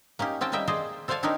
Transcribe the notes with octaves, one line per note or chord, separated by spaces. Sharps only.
A#3 C#4 D#4 G4
C4 C#4 G5 A5
G3 A#3 D#5 E5 G5
G#4 C5 D5 D#5
A4 C5 D5 F5 G#5 A5
C4 D4 D#4 G4 A#4 C#5